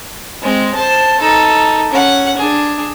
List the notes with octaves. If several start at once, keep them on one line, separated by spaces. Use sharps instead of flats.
G#3 C4
C5 A5
D#4 A4
C#4 F#5
D4 G#4